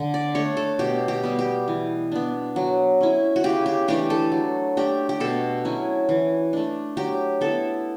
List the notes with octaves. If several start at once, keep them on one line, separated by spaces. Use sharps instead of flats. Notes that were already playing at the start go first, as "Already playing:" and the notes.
Already playing: D3
D5
A3 D4 C#5
A4
B2 G4
G4
G3 B3
G4
E3
B3 D4
F#3
C#4 E4
F#4
C#3 G4
G4
E3 A3 D4 G4
A4
F#3
A3 D4 G4
G4
B2 A4
F#3 C#4 E4
E3
A3 D4
F#3 G4
B3 E4 A4